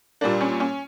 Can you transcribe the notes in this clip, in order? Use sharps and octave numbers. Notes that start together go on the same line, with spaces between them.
A#2 G3 A#3 D4
C#4
C#4